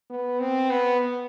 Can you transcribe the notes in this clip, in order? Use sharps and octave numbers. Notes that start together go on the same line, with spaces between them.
B3
C4
B3